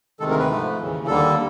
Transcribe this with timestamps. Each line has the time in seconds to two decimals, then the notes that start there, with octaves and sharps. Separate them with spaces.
0.20 D2 C3 D#3 G#3 A4
0.30 A#4
0.39 B4
0.49 G#2 F3 A3
0.79 D#2 C#3 E3
1.06 D#2 D3 G3 A#3 A4